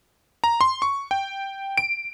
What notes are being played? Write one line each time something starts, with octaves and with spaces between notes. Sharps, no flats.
A#5
C6
C#6
G5
D7